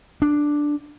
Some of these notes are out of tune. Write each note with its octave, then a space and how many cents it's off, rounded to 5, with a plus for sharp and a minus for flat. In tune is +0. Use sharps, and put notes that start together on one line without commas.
D4 +0